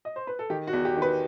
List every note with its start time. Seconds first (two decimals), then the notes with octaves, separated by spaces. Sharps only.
0.05 D#5
0.16 C5
0.27 B4
0.39 A4
0.50 D#3 G4
0.67 F#4
0.73 E2
0.85 G4
0.97 D#3
1.02 B4